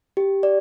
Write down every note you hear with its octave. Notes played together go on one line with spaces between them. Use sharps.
G4
D5